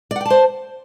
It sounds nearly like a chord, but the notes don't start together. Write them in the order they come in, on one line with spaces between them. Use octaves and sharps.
D5 F#5 G5 A5 C5